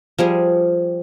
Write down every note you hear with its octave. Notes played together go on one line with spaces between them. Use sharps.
F3 G3 G#4